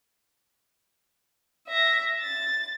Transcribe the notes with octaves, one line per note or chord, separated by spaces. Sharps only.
E5 A#6
A6